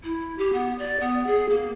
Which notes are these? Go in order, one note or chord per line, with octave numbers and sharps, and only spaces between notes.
E4
G4
B3
D5
B3
G#4
A#3